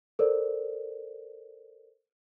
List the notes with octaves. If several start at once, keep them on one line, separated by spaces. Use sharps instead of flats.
A4 A#4 C5 D5